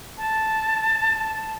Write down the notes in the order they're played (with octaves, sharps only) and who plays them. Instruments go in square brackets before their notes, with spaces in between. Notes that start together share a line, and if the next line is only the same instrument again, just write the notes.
[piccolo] A5